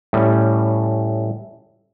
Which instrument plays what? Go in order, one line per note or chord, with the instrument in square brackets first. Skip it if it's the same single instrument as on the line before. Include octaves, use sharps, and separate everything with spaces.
[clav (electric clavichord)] A2 G3 C#4